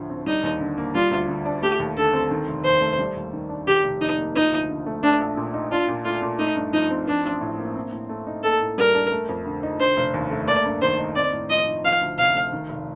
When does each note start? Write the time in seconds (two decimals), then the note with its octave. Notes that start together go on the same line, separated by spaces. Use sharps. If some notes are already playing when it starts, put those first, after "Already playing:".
Already playing: D2 A2 D3 F3
0.10 C4
0.26 G3 D#4
0.43 D#2
0.60 D3
0.78 A#3
0.94 G3 F4
1.11 D2
1.29 D3
1.45 D4
1.62 A3 G4
1.80 D#2
1.97 D3 A4
2.13 C4
2.31 D#3
2.48 F1
2.64 D#2 C5
2.81 A3
2.99 G3
3.16 D#2
3.33 D#3
3.49 D4
3.67 D#3 G4
3.84 F1
4.01 F2 D#4
4.18 A#3
4.35 F3 D#4
4.52 D2
4.69 D3
4.86 A3
5.03 A3 D4
5.20 A#1
5.37 A#2
5.54 D#4
5.71 D4 F4
5.88 A#2
6.05 A3 F4
6.22 A#2
6.39 A3 D#4
6.56 G2
6.73 F3 D#4
6.90 C4
7.08 F3 D4
7.25 A1
7.41 A2
7.59 A#3
7.75 C4
7.92 A2
8.09 A3
8.27 D#4
8.43 A#3 A4
8.61 A2
8.78 G3 A#4
8.95 D4
9.12 A3
9.29 F2
9.46 D3
9.63 D#4
9.80 D3 C5
9.97 F1
10.14 D#2
10.31 A3
10.48 A#3 D5
10.65 G2
10.82 D#3 C5
10.99 D#4
11.16 C4 D5
11.33 A2
11.50 F3 D#5
11.67 D#4
11.84 F3 F5
12.01 D2
12.18 C3 F5
12.35 A3
12.53 D#3
12.69 F1